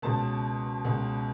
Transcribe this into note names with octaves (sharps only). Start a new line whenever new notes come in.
C#2 B2 A5
C#2 B2